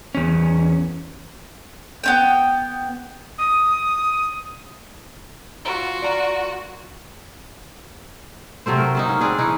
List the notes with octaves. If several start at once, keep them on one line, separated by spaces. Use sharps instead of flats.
E2 C#4
B3 C#4 G5
D#6
F4 F#4
A#4 D5 A#5
C3 F#3 A3 C5
A#4
F#3 A#3 D#4
C#4
C4 D4 G#4
E3 C#4 D#4